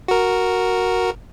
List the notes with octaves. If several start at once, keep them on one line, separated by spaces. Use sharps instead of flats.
F#4 A#4